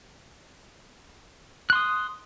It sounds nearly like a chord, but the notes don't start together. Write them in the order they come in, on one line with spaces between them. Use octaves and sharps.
F#6 C6 D#6